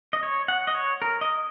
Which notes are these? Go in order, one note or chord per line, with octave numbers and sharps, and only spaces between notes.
D#5
C#5
F#5
D#5
C#5
A#4
D#5